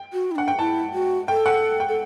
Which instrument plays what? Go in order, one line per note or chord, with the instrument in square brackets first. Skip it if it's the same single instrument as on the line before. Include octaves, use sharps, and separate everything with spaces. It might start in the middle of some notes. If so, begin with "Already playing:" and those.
Already playing: [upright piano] G5
[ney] F#4
E4
[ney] D4 [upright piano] F#5
[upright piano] G5
[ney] E4 [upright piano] A5
[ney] F#4
[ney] A4 [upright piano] G5
[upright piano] F#5
G5
[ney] A4